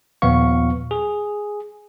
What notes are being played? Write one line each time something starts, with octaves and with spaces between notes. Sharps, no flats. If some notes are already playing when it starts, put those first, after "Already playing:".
D#2 A#2 F3 B3 F5 C#6
G#4